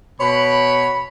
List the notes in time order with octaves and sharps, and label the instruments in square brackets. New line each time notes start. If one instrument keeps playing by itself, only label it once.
[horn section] B2 C#5 B5